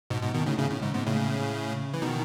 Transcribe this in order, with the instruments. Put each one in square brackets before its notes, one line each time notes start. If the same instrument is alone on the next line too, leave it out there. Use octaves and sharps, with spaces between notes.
[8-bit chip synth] G#2 B2
G#2 B2
B2 D#3
A2 C#3
A2 C#3
A2
G#2
G#2 B2
A2 C#3
E3
B2 D#3